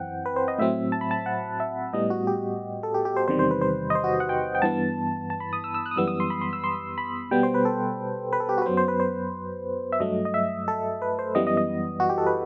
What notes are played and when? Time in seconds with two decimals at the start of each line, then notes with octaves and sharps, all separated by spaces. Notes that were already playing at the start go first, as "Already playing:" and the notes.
Already playing: F#2 E3 C4 F#5 G5
0.26 B4
0.36 C5
0.48 D#5
0.59 A2 F#3 C4 E5
0.92 A5
1.01 B5
1.11 A5
1.26 F#5
1.60 E5
1.93 A2 G3 B3 D#5
2.10 F#4
2.27 G4
2.83 A4
2.94 G4
3.05 G4
3.17 C5
3.28 E2 C3 D#3 G3 C5
3.39 C5
3.51 B4
3.62 C5
3.90 D#5
3.95 C5
4.04 F#4
4.20 F#5
4.29 G5
4.55 G5
4.62 G2 E3 B3 A5
5.30 A5
5.40 B5
5.53 D#6
5.64 E6
5.74 E6
5.86 F#6
5.91 D#6
5.96 F#2 E3 G3 B3 E6
6.08 D#6
6.20 C6
6.30 B5
6.41 C6
6.53 E6
6.64 C6
6.98 B5
7.31 B2 G3 B3 G5
7.43 C5
7.54 B4
7.65 A4
8.33 B4
8.40 A4
8.49 G4
8.58 F#4
8.62 B4
8.66 F#2 F#3 B3 C5
8.77 C5
8.88 B4
9.00 C5
9.92 E5
10.00 G2 F#3 A3 D#5
10.25 D#5
10.34 E5
10.68 A4
11.02 B4
11.19 C5
11.35 F#2 E3 G3 B3 D#5
11.47 D#5
11.57 D#5
12.00 F#4
12.10 G4
12.18 A4
12.27 B4